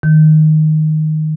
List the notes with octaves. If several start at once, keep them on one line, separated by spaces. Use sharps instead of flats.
D#3